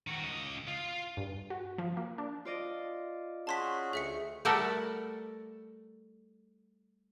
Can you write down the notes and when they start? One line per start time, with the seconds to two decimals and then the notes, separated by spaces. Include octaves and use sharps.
0.07 D#3 F#4
0.23 C#2 D#5
0.67 F4
1.17 G2
1.50 F#4
1.78 F3
1.97 A#3
2.18 D4
2.45 F4 D5 D#5
3.47 C#4 F#4 G#4 A5 C6 B6
3.93 D2 A3 G#4 E5 C#7
4.45 G3 A3 A4 A#4 F#5